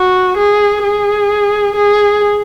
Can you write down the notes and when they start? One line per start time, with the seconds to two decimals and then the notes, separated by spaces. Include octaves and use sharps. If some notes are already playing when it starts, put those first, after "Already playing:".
Already playing: F#4
0.37 G#4
0.84 G#4
1.76 G#4